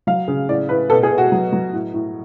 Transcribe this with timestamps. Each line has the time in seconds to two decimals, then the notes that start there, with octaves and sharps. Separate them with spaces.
0.07 F#3 F5
0.28 C#3
0.48 A2 D5
0.69 A2 B4
0.90 B2 A4
1.03 G#4
1.10 B2
1.18 F#4
1.32 F#3
1.53 F#3
1.73 A2
1.94 A2